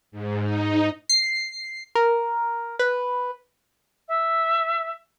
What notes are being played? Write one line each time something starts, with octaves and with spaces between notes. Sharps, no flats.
G#2
D#4
C7
A#4
B4
E5